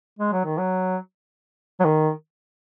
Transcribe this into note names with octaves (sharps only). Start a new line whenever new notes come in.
G#3
F#3
D#3
F#3
F#3
D#3